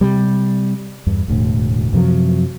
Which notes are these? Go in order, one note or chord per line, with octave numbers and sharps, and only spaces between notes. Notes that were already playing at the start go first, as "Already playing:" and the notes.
C3 G3
E2 G2
E1 D2 A2
F#2 C3 F3 F#3